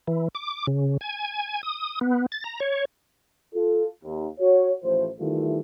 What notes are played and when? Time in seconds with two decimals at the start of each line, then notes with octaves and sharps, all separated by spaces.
0.08 E3
0.35 D6
0.67 C#3
1.01 G#5
1.63 D#6
2.01 B3
2.32 A6
2.44 A#5
2.60 C#5
3.55 F4 A4
4.04 D#2
4.40 F#4 C#5
4.83 A1 A2 F3 C5
5.20 D#3 E3 G3 A3 E4 F4